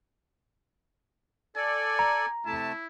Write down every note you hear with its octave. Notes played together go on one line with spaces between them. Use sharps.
A4 D5 G#5
A#5
C3 A3 E4 A5